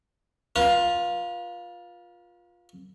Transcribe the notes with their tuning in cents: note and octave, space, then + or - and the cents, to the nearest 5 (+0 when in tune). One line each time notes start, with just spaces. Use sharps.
F4 +10 B4 -40